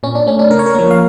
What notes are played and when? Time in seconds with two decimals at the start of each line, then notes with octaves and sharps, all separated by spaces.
0.03 A#2 C#4
0.15 D4
0.27 A3 C#4
0.39 D4
0.51 C#3 A#4
0.59 C#5
0.66 A#4
0.75 F3 A#3
0.91 F5